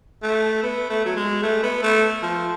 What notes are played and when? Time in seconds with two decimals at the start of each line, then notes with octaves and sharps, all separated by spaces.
0.23 A3
0.63 B3
0.90 A3
1.05 F#3
1.16 G#3
1.43 A3
1.63 B3
1.83 A3
2.22 F3